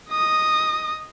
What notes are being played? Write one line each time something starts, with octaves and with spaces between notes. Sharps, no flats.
D#5 D#6